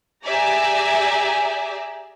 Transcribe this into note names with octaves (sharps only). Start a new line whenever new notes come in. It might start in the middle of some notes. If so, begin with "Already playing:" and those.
G4 G#4 D5 E5 G#5 A#5